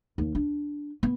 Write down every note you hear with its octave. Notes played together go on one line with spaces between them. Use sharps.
D#2
D4
B3